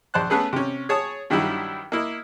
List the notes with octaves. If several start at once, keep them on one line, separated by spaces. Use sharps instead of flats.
A#1 C5 A5 F#6
A3 B3 C#4 G#4 A4 B4
C3 C#4
G#4 C#5 A5 D#6
G2 D#3 F#3 G3 E4
A#3 E4 D#5